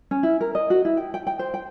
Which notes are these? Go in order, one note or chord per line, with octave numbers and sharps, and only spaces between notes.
C#4
E4
A#4
D#5
F#4
E4
G5
G5
G5
C5
G5